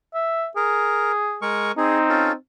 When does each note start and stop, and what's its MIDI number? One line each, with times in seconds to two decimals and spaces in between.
0.14 0.47 76
0.56 1.41 68
0.56 1.12 70
1.42 1.72 56
1.42 1.72 70
1.42 1.72 85
1.78 2.35 60
1.78 2.34 63
1.78 1.98 68
2.09 2.32 61
2.09 2.32 65
2.09 2.32 69